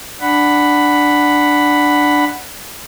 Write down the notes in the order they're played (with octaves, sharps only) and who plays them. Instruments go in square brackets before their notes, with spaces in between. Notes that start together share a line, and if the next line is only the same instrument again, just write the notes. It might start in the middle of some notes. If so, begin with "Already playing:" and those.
[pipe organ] D4 F#5 B5